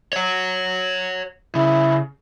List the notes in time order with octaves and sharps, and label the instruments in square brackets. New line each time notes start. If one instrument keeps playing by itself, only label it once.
[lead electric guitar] C#5 F#5
[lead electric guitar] C#3 [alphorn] E4